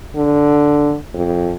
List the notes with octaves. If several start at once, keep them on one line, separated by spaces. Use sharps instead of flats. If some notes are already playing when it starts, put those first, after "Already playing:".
D3
F2